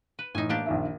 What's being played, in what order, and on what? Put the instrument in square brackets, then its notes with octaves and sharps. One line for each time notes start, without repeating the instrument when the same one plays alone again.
[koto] B4
[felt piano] A2 E3 [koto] D#4 G#5
[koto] A#3 D4 G4
[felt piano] A#1 D#3 E5